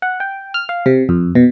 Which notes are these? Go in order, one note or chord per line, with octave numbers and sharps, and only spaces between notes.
F#5
G5
F6
F5
C3
F2
B2